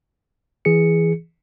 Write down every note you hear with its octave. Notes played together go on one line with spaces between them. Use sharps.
E3 G#4 C#7